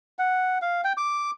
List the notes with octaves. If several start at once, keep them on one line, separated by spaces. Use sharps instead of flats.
F#5
F5
G5
D6